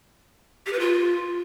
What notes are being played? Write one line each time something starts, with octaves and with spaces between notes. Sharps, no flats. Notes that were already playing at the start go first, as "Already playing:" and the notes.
G4
B4
F4